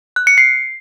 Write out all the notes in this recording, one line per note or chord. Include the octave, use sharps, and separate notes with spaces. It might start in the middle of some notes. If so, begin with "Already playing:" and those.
F#6
C#7
C7